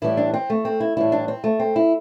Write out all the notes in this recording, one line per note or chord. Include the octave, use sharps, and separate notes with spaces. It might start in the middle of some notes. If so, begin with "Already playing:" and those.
A2 E3 G3 E4
D4
C4
A3
C4
E4
A2 E3 G3 E4
D4
C4
A3
C4
E4